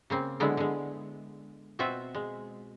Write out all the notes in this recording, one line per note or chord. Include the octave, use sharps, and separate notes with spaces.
C#3 A#3 C4
D3 F#3 G#3 B3 E4
D3 G#3
B2 C4 F4 F#4 E5
G#3